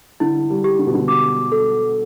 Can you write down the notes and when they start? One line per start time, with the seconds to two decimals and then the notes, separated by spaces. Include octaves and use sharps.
0.20 D3 E4
0.50 G3
0.64 G4
0.79 D3
0.87 B2
0.94 D3
1.08 D6
1.52 A4